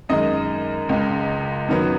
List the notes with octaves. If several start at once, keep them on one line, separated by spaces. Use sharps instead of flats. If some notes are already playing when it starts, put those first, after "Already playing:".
F#2 D#3 G#3 D#5
C#2 C#3 G#3
F#2 D#3 F#3 B3